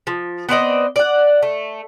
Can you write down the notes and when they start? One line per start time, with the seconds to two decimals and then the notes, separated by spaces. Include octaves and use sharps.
0.07 F3
0.49 B3 C4 D5 D#5
0.96 D5 F#5
1.43 A3